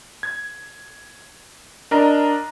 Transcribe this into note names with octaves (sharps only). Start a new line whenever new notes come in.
G#6
D4 A#4 D#5 A#5